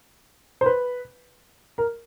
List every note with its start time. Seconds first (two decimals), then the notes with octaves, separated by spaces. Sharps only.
0.61 C5
0.66 B4
1.78 A#4